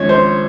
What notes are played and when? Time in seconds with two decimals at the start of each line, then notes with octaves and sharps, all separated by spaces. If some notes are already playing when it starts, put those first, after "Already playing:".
Already playing: G#1 F3 C#4 C#5
0.09 C5